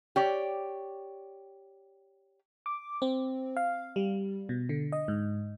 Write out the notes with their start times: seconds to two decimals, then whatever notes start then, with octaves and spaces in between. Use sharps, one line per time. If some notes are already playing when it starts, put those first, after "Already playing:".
0.16 G4 C#5 D5
2.66 D6
3.02 C4
3.57 F5
3.96 G3
4.49 B2
4.69 D3
4.92 D#5
5.08 G#2